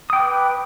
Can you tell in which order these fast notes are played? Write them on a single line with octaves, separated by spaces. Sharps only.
D#6 G5 D6 B4